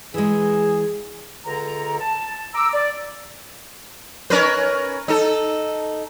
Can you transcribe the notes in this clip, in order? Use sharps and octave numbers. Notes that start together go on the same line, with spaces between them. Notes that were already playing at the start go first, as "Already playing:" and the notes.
E3 G#3 G#4
C#2 D3 A#5
A5
A#5 D6 E6
D5
C#4 A#4 B4
D#4 A4